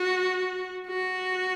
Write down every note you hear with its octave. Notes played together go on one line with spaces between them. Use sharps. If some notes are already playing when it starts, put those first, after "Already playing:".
Already playing: F#4
F#4